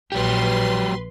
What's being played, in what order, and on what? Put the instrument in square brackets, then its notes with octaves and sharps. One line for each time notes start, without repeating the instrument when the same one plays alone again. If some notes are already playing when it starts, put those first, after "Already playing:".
[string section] A#1 B4 C6 [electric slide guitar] F#3 G4